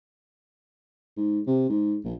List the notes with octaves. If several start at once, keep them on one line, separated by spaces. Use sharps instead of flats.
G#2
C3
G#2
A#1